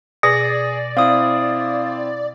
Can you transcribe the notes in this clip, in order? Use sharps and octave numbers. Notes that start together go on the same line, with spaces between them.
B2 G#4 D5 A#6
C4 E4 F5 D#6